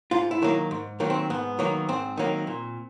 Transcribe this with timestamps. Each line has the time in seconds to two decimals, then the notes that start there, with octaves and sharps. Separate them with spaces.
0.11 G#2 F4
0.31 E4
0.42 D#3 F#3 A#3
0.71 G#2
1.00 D#3 F#3 A#3
1.10 C4
1.30 G#2 B3
1.59 D#3 F#3 A#3
1.89 G#2 C4
2.17 D#3 F#3 A#3
2.47 A#2